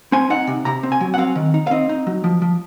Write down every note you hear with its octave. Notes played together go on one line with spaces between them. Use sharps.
C4 G#5
D#4 F#5
C3
C3 A#5
C4
G#5
F#3
F#5
C4 F5
D#3
D#4
F5
C4 D#5
D#4
F#3
F3
F3